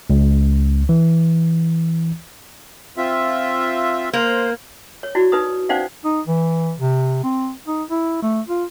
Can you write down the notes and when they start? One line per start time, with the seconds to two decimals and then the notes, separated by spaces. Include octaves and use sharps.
0.10 C#2
0.89 E3
2.97 C4 F4 E5
4.13 A#3 C5
5.03 C#5
5.15 E4 F#4 D5
5.32 D#4 B4 D#6
5.69 C#4 D#4 C5 D5 F5 F#5
6.05 D#4
6.27 E3
6.79 C3
7.23 C4
7.67 D#4
7.90 E4
8.22 A3
8.48 F4